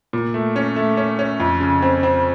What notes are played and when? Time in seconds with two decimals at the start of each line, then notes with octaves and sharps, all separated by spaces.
0.13 A#2
0.34 A3
0.56 C#4
0.76 A3
0.97 C#4
1.19 C#4
1.40 F2
1.60 C#3
1.82 C4
2.03 C4